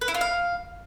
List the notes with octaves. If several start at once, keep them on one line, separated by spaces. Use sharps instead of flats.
B4
E4
F4
F5